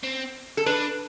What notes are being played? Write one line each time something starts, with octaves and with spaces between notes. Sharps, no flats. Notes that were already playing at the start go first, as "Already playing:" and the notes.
C4
A4
D4 B4